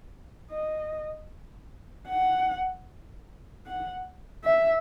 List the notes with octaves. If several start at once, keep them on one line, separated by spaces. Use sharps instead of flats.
D#5
F#5
F#5
E5